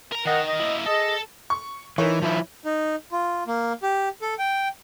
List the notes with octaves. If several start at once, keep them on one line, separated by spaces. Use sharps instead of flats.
A#4 A#5
D#3 A#4 D#5 F#5
D#5
A#3 E4
G#4 A4 D#5
C#6
E3 D#4 A#4 C#5
F3 E4
D#4
F4
A#3
G4
A4
G5